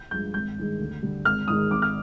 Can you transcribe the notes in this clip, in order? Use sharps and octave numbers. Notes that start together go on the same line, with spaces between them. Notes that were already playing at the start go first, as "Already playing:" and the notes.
Already playing: G6
G2 F3 G#3 G6
G#1 G6
G2 D#3 G#3
D2
D3 G3
G#1 F6
G#2 D#3 G#3 D#6
G#1 D6
F6